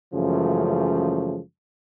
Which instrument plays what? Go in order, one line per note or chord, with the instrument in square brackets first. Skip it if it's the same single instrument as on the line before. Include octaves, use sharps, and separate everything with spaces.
[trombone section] F#2 C#3 E3 F3 G#3 A3